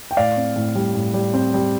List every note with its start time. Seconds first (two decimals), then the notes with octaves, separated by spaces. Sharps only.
0.11 G5
0.17 A2 D5 F5
0.37 C4
0.56 A2
0.75 G3
0.95 A2
1.14 G3
1.34 C4
1.54 G3